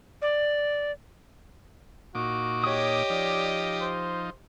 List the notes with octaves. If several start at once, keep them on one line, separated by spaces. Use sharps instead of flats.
D5
A#2 D#4 F#4 D6
G4 C#5 D#5 D#6
F3 D#4 D5
C5